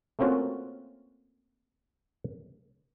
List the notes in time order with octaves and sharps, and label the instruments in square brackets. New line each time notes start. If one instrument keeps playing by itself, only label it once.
[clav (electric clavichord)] A3 A#3 C4 C#4 F4 F#4